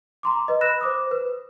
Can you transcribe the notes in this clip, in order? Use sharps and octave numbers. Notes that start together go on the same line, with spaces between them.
A#5 C6 D6
B4 D#5
B5 E6 F#6 A#6 E7
C5 D6 D#6
B4